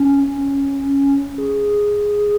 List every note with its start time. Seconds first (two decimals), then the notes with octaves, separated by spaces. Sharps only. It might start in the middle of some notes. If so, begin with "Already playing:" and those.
Already playing: C#4
1.38 G#4